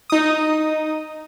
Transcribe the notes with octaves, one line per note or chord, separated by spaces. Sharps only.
D#4 D#6